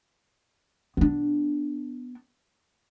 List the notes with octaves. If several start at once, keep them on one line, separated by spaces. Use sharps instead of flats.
B3 D4